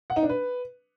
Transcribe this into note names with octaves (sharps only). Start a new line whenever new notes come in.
F#5
D#4
D4
B4